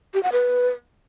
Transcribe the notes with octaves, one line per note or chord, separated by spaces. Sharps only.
G4
F#5
B4